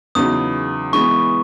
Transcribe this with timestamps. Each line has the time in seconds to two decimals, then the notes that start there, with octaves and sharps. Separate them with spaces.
0.15 E2 C#3 F#3 B3 D#4 D#6
0.93 E3 G#3 B3 C#6